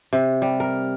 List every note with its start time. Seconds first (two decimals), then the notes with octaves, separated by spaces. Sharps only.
0.13 C3
0.42 G3
0.60 A#4